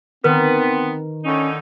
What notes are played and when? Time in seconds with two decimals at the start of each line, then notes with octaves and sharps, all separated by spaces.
0.24 D#3 B3 C4 B4
1.25 A2 D3 C#4 D#4